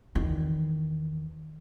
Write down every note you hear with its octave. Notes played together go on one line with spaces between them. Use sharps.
E2 D#3